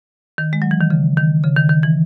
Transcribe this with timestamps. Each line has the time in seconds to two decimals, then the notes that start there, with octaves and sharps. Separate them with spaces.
0.38 D#3
0.53 G#3
0.62 F#3
0.71 E3
0.81 D#3
0.90 C#3
1.17 D#3
1.44 C#3
1.56 D#3
1.69 D#3
1.83 E3